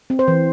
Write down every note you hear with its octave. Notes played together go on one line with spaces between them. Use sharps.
C4
C5
E3